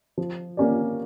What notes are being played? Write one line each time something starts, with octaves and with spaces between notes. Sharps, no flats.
F3
A#3 C#4 G4 D5